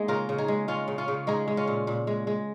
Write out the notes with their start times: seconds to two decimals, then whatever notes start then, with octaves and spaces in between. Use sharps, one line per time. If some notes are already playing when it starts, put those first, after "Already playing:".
Already playing: G#3 A#3 D#4 G#4
0.08 C#3 F4 A#4
0.29 C#3
0.38 D#4 G#4
0.48 G#3
0.68 G#3 C#4 F4
0.88 C#3
0.98 C#4 F4
1.08 C#3
1.27 G#3 D#4 G#4
1.48 G#3
1.57 C#4 F4
1.67 A#2
1.87 A#2
2.07 G#3
2.27 G#3